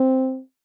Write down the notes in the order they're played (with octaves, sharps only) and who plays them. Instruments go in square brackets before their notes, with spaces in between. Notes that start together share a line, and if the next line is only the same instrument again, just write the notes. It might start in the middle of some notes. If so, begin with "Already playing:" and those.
Already playing: [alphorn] C4